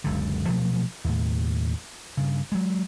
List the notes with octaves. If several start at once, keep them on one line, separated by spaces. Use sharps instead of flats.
F#1 C#2 D3
B2 F3 F#3 A3
D#2 A2
G2 C#3
F#3 G#3